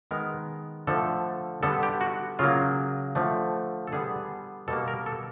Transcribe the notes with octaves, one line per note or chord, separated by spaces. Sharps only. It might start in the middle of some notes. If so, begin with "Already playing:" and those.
D#3 G#3 B3 A#4
D3 F3 A3 A4
D3 G3 B3 A4
G4
F#4
C#3 F#3 A#3 F4
D3 F3 A3
A4
D3 G3 B3 G#4
B2 G3 A#3 A4
A#4
A4